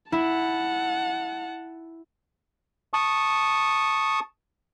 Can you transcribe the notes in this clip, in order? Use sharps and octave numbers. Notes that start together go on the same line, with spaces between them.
E4 F#5 A5
A5 C#6 D#6